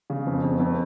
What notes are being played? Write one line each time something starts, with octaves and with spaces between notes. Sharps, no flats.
C#3
F2
F2
F2